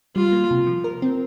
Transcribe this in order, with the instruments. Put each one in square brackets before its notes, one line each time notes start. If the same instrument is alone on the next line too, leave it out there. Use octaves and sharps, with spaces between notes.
[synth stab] G3 [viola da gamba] F4
[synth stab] A#3
C3
F3
A#4
C4